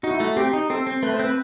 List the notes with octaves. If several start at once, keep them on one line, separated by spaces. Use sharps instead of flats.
D#4 F#4
E4
A3 F#4
C4 G4
D#4
C4 A4
C4
A3 B4
C5
C4
B4